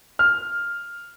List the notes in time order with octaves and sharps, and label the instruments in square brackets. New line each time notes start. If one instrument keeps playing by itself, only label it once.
[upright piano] F6